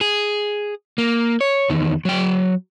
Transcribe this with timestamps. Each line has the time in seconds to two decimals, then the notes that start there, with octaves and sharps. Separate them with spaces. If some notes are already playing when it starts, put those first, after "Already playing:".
0.01 G#4
0.98 A#3
1.41 C#5
1.70 E2 D#3
2.05 F#3 G5